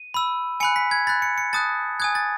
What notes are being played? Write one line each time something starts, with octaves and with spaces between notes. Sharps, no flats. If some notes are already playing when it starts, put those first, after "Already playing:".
Already playing: D#7
B5 E6
G#5 B5 F#6 C#7
B6
G#6
B5 F#6 A6
C#7
C#7
A5 D#6 F#6 A6
G#5 D#6 F#6 G#6
A6